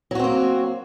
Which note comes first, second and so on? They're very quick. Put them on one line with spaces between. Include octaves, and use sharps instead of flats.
F#3 F#4 C4 A#3